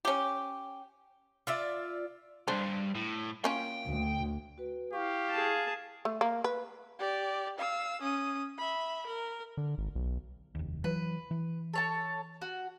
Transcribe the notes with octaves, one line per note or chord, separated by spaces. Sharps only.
C#4 G4
F4 D5 E5
C2 G2 D4 C5
A2
A#3 C#4 F4 G5
D2
F#4 B4
E4 G4 F5 C#6
G#4 A5
A3
A#3
B4
G4 D5
F5 E6
C#4 D#6
E5 B5
A#4
D3
G#1
B1
F1 D#2
E3 F#3 B4
E3
A4 C#5 A5
F#4